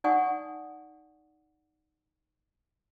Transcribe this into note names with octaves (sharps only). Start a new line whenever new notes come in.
D#4 D5 F#5 G#5 C#6 D#6